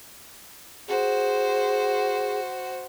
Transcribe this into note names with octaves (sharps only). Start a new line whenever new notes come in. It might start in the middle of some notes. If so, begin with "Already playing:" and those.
F#4 G#4 C5